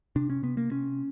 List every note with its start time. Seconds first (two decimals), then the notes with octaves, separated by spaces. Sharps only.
0.16 C3 D4
0.30 C#4
0.43 C3 B3
0.57 A#3
0.71 C3 C#4